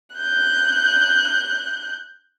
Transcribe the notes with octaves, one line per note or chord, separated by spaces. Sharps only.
F#6 G6